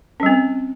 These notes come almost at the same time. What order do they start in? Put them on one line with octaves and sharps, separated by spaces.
C#4 G3 C4